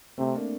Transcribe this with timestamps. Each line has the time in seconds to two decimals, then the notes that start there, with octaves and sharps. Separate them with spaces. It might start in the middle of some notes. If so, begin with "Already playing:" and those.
0.18 C3 A3 C4
0.35 A#3 D4